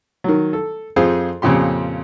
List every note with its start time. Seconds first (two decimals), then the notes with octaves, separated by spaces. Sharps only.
0.24 D#3 F#3
0.53 A4
0.96 F2 F4 G#4 C5
1.42 F2 A#2 C#3 F3 G4 C6